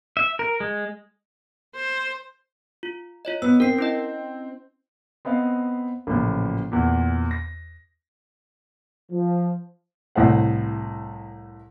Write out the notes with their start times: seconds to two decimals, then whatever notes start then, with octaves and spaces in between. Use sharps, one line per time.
0.17 E5
0.39 A#4
0.60 G#3
1.75 C5
2.83 F4
3.25 F4 C#5 D#5
3.42 B3 E6
3.60 C4 A#4 C7
3.78 C#4 E4 D#5
5.25 B3 C4 D#5 F5
6.07 A1 A#2 C#3 F3
6.72 E2 A#2
7.31 A#6
9.11 F3
10.15 C2 A2 C5 F#5